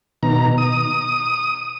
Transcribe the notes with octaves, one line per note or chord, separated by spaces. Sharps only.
B2 D#3 A#5
D#6